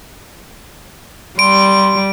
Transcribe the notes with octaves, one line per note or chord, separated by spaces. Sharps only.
G3 C6 D7